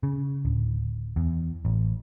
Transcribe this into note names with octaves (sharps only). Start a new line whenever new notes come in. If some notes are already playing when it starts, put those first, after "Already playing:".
C#3
D1
E2
A1